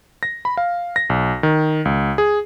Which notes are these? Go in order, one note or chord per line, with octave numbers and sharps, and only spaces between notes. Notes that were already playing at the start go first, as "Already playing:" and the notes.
A#6
B5
F5
A#6
B1
D#3
C#2
G#4